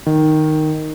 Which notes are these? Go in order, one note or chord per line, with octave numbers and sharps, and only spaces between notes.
D#3